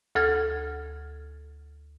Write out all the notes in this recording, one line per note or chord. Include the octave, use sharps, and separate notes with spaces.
D2 A4 F6 G#6